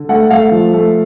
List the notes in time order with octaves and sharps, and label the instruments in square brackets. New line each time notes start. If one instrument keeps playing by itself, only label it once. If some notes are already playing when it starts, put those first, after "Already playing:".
Already playing: [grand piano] D3
A3 F#5
F#5
A3 F5
F3
A3